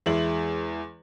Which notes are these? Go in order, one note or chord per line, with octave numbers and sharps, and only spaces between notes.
E2 G#3 E4 F#7